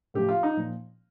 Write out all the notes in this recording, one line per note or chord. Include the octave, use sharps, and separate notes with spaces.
A2 F3 G4
F4
D#4
A#2 F3